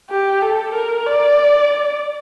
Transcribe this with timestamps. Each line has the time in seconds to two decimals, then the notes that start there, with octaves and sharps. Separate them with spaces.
0.10 G4
0.42 A4
0.74 A#4
1.06 D5